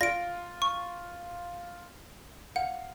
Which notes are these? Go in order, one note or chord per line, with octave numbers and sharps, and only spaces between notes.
F4 A#6 D7
C#6
F5 F#5